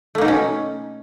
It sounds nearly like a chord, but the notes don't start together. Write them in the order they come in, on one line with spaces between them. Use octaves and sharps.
A3 A#3 D#4 B2 C#4